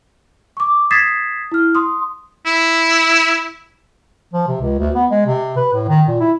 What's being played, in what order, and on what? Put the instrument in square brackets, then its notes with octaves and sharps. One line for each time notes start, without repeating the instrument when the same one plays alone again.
[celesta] C#6 D6
D#6 G#6 A6 B6 C7 E7
E4 F6
C6 D#6
[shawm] E4
[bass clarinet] F3
C3
C#2
D2
B3
G#3
C3
B4
A2
D#3
A#2
E4